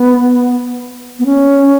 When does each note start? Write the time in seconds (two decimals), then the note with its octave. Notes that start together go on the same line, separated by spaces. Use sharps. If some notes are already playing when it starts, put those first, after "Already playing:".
Already playing: B3
1.19 B3
1.26 C#4